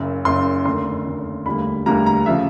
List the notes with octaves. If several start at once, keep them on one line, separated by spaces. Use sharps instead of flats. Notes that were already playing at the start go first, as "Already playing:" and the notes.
Already playing: F#1 F#2 C#3
F#1 F#2 C#3 C6
F1 D#2 D3 C6
F1 D#2 D3
E1 D2 D3 G3 A#3 B5
E1 D2 D3 G3 A#3 A#5
A#5
C#3 F3 A3 E5